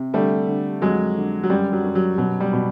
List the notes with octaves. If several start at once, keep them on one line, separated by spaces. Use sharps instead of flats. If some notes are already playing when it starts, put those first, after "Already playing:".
Already playing: C3
D3 G3 A3
D3
F2 F#3 G#3
D3
F#3
F#2 G3
F#3
F#2
F#3
B2 F#3
G3
B2